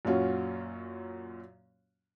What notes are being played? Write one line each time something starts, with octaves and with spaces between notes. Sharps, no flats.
F#2 A#2 F#3 C#4 F4 F#4